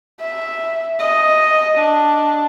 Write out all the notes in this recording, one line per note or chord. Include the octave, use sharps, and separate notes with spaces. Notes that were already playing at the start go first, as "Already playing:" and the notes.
E5
D#5
D4